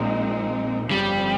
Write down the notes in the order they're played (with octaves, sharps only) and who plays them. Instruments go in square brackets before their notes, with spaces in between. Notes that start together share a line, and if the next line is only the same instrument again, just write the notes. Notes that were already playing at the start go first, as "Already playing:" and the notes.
Already playing: [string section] A#1 A#2 G#3 C4 D#4
[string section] G1 F2 C#3 F3 C4 [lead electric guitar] G3